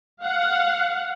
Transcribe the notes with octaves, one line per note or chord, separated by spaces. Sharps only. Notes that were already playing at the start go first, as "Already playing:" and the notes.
F5 F#5